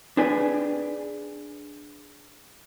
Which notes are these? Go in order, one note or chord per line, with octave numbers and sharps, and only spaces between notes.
D4 G#4 B4 G5 G#5